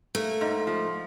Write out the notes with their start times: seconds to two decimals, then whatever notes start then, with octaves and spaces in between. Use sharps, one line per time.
0.15 A3 A#3
0.41 G#2
0.67 F3